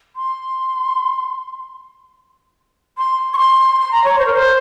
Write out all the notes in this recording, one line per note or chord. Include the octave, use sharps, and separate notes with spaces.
C6
C6
C#6
C6
C6
A#5
C#5
C5
A#4
C5